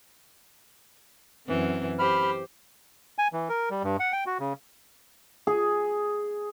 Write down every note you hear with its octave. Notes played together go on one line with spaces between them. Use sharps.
F#2 E3 C4
G4 C5 B5 F6
G#5
E3
A#4
G3
G2
F#5
G5
F#4
C#3
G#4